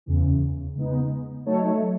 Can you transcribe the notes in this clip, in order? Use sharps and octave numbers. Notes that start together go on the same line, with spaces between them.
E2 C#3 E3
C#3 G#3 B3 D#4
F#3 A3 D#4 A4 C#5